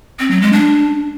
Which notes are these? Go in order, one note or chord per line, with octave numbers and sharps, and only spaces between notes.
C4
F#3
G#3
D4